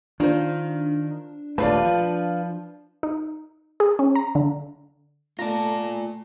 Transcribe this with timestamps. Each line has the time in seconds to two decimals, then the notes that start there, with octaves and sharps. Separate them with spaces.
0.20 D#3 D4 F4 C5
1.58 D#1 A3 F4 B4 D5 F5 A5
1.85 F3
3.03 D#4
3.80 G#4
3.99 C#4
4.15 A#5
4.35 D3
5.39 A3 F4 D5 A5 A#5